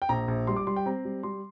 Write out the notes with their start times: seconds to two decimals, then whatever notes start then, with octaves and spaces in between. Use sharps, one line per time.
0.02 G5
0.09 A#1 A#5
0.28 A#1
0.47 G3 C6
0.56 D6
0.67 G3 C6
0.76 G5
0.86 C4 A#5
1.05 G3
1.23 G3 C6